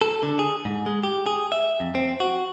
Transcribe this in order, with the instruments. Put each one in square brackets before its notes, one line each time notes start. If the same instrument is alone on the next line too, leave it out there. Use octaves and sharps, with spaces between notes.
[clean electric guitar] A4
D3
G#4
G#2
G#3
G4
G#4
E5
F2
C4
F#4